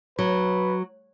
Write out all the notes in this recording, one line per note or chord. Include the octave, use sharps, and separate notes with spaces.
F#3 B4